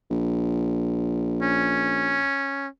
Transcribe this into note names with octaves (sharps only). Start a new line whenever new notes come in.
A#1
C#4